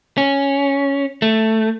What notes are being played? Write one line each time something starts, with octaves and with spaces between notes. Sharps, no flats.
C#4
A3